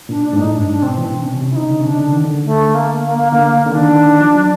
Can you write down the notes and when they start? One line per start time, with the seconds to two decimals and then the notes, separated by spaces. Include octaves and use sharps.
0.09 A#2 D4
0.24 D4
0.33 G#2
0.38 A2 D#4
0.53 G2 D4
0.68 G#2 D4
0.82 B2 C4
0.97 E3 C4
1.12 B2
1.21 D4
1.27 C3 C#4
1.41 C3
1.51 E4
1.55 C#3 D#4
1.70 D3
1.80 C3 C#4
1.86 C#3 D4
2.00 D3
2.13 D#3
2.25 D3
2.45 A3
2.74 A#3
3.04 A#3
3.18 A#3
3.32 D3 A#3
3.51 A#3
3.66 D3
3.71 D#3 D4
3.92 D#3
4.06 D#3
4.21 F3
4.35 F#3